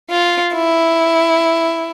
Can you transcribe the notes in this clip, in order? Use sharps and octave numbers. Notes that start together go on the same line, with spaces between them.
F4
E4